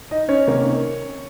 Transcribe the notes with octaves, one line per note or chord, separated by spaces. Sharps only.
D#4 D#5
C#4 C#5
C3 D#3 A#3 C#4